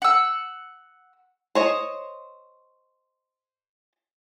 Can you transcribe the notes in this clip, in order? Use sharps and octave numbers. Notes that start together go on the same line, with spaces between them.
F#5 E6
C5 C#5 D#5